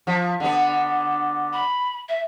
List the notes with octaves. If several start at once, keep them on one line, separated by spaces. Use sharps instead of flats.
F3
D3 B3
B5
E5